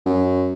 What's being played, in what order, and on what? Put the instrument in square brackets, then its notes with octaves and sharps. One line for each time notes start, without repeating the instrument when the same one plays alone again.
[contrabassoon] F#2